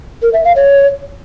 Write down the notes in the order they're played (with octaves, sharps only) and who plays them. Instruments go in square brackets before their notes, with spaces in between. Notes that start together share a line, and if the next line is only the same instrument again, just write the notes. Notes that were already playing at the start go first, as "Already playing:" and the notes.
[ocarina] A#4
E5
F5
C#5